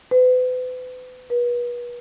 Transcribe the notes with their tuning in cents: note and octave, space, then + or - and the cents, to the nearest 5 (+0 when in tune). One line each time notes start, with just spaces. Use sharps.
B4 +40
B4 -35